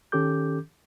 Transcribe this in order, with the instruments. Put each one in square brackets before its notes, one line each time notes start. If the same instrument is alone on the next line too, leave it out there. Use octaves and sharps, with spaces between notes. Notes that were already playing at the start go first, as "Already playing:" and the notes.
[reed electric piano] D#3 C#4 G4 A4 D6 G6